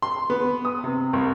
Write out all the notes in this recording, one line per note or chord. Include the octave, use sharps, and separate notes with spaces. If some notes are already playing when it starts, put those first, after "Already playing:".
C6
B3
D#6
C3
C2